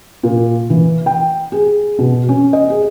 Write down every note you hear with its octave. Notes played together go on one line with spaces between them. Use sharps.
A#2
E3
G5
G#4
B2
C#4
D#5
G#4